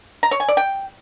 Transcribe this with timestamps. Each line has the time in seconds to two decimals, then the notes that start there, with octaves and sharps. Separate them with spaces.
0.23 A#5
0.31 C#5
0.40 G#5
0.49 D5
0.57 G5